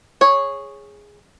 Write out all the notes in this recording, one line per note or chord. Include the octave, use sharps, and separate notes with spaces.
G#4 C#5